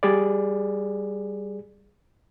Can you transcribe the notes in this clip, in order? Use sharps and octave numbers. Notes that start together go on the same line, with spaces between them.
G3 G#4 D5